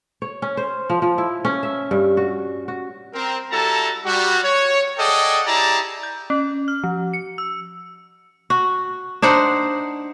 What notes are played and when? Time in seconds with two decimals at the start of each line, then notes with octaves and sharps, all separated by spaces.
0.22 C#5
0.42 C#4
0.57 C5
0.90 F3
1.02 F3
1.18 E4
1.45 C#4
1.63 E5
1.91 G2
2.17 F#4
2.68 F#4
3.14 C4 A#4
3.52 G3 E4 F#4 A4 A5 A#5
4.05 G3 F#4
4.44 C#5
4.99 G#4 A4 D5 D#5 F#5 G5
5.46 E4 G4 G#4 D5 A5 A#5
6.03 G6
6.30 C#4
6.68 F6
6.84 F3
7.13 C#7
7.38 E6
8.50 F#4
9.22 D4 D#4 C5 F#5